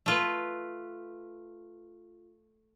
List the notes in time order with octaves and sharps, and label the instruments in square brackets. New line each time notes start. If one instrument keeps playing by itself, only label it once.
[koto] A3 F4 B4